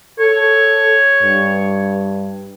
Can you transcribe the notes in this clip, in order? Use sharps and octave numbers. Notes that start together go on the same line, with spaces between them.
A4 C#5
G2